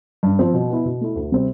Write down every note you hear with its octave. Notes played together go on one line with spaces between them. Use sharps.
G2
F3 C4
B2
B3 E4
B2
A3 E4
D2
C3 G3 C4